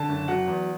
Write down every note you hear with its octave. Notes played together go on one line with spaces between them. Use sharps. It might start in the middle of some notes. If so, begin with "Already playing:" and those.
Already playing: D3 A5
F#1
F#3 F#5
E2